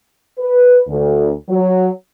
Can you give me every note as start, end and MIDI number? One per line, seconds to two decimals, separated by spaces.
0.39 0.80 71
0.88 1.32 38
1.49 1.87 54